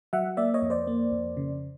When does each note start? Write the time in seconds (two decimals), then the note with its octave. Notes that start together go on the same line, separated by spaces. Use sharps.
0.13 F#3 E5 F#5
0.37 A#3 D5 E5
0.54 C#5 D#5
0.62 F2
0.70 C5 D5
0.87 A#3
1.12 F2
1.37 C#3